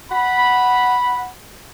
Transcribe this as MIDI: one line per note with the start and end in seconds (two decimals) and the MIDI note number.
0.11 1.27 78
0.11 1.27 83